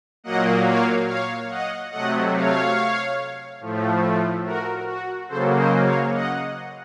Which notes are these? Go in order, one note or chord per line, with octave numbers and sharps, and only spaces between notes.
A#2 F#3 A#3 D#5 F#5
C#5 F5
C#5 F5
D#5 F#5
C3 F#3 A3 D#5 F#5
C#5 F5
A2 F3 A3
F#4 A#4
F#4
C#3 F#3 A#3 A4 C5
C5 D#5
C#5 F5
D#5 F#5